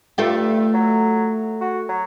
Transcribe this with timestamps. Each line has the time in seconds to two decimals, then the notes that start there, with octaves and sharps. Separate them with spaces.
0.18 G2 A3 F4 G4
0.74 F#3
1.61 F#4
1.89 F#3